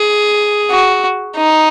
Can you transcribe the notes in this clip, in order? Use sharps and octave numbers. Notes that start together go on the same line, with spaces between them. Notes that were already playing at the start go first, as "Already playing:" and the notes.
Already playing: G#4
F#4
D#4